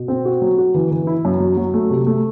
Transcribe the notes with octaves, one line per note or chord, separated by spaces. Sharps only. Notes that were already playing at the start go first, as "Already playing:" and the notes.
Already playing: B2
C4
F#4
F#3
F#4
E3
E3
E4
F#2
F#3
F#3
A3
C3
A3